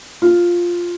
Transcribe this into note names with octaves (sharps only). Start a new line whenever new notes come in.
F4